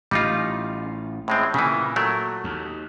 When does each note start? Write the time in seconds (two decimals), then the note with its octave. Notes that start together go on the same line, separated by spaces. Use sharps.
0.11 A1 G3 D#4 F4
1.28 A2 G#3 C4
1.54 A#2 C#3 E3
1.96 F#3 A3 A#4
2.44 D#2